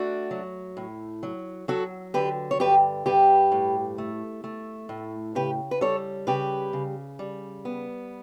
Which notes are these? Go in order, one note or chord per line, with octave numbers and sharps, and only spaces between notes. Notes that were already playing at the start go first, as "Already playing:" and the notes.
Already playing: A3 D4 F#4
F#3
A2
F#3
F#3 F#4 A4
D3 G4 B4
C#5
G2 G4 B4
G2 G4 B4
A2
A3
A3
A2
C#3 G4 B4
B4
G3 A4 C#5
C#3 G4 B4
C#3
G3
B3